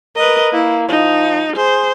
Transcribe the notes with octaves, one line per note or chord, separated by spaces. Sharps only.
A#4 B4 D#5
A#3 E4
F3 D#4
G#4 C5